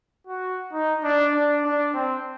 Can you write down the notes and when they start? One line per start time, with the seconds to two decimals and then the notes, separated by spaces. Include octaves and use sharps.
0.27 F#4
0.73 D#4
1.04 D4
1.34 D4
1.64 D4
1.94 C4